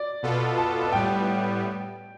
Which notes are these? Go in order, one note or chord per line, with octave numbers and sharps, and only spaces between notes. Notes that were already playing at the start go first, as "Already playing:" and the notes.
Already playing: D5
B2 B3 F4 A4
A5
A5
A2 G3 B3 G5